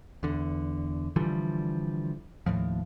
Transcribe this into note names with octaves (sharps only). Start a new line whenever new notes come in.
E2 D3
D3 E3 F3 G3
D#2 A2 F3